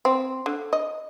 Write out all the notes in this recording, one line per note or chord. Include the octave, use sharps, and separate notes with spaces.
C4
D3
D#5